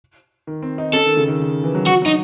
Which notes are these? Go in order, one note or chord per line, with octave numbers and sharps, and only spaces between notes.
D#3
C4
D#4
C#4 A4
D#3
C#3
D#3
C#3
E3
F#3
F#3 F#4
F#3
D#4